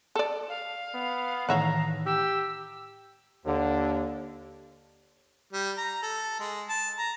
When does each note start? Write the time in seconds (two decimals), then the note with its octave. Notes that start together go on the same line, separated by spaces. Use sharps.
0.15 A4 D5
0.49 F5
0.94 B3
1.49 A2 D#3 E3 C#5 E5 F#5 A#5
2.06 G4 E6
3.45 D#2 D3
5.53 G3
5.78 A#5
6.03 A4
6.40 G#3
6.69 A5
6.99 A#5